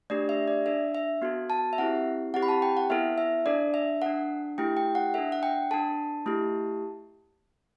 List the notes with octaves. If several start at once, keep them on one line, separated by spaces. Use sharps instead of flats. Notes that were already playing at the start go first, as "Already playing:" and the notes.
A3 D4 G4 D5
E5
D5
D4 A4 E5
E5
B3 F#4 A4
A5
E5
C4 E4 G4 F#5
C4 E4 G4 F#5
B5
A5
G5
F#5
B3 E4 A4 E5
E5
D4 A4 D5
E5
D4 A4 F#5
A3 E4 G4 G5
G5
F#5
D4 A4 E5
F#5
G5
D4 A4 A5
A3 E4 G4